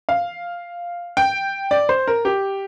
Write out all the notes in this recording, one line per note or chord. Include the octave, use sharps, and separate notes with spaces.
F5
G5
D5
C5
A#4
G4